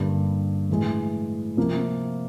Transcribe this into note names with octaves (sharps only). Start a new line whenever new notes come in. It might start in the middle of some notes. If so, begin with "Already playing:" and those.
Already playing: G2 D3 G3 A#3
A2 E3 G#3
C3 F3 A#3